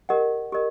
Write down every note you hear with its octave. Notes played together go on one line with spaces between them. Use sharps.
G4 A#4 D#5 F#5
G4 A#4 D#5